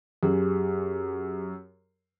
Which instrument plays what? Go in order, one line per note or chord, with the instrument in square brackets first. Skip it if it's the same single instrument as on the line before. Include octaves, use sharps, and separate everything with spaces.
[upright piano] F#2 [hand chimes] G4 G#4